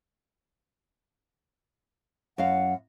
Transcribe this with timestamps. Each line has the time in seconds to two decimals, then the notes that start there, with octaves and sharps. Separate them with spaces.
2.38 F#2 F5 F#5